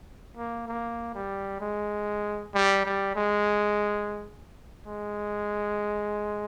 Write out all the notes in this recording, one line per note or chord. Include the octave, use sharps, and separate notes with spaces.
A#3
A#3
G3
G#3
G3
G3
G#3
G#3